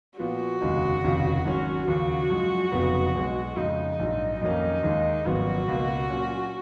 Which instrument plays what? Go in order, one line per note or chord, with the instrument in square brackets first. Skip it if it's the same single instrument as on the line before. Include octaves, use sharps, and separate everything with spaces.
[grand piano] A#2 F3 B3 F4 [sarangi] F#4
[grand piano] F1 D#2 C#3 G#3 D#4
F1 D#2 C#3 F3
G#1 G#2 F#3 C#4
[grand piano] D#2 C#3 F3 [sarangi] F#4
[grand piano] F#2 F3 G#3
F1 F2 C#3 F#3 B3
B1 B2 G#3
[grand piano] F2 C#3 G#3 [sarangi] D#4
[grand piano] A#1 G#2 F#3
[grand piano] F2 D#3 F#3 A#3 C#4 [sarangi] D#4
[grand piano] D#2 D#3 G#3
[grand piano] G#1 F#2 F3 B3 F4 [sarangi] F#4
[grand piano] C#2 B2 A#3
A#2 F#3 C#4